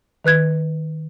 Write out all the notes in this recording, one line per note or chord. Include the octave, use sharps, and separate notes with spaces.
D#3 B4 F#6 G#6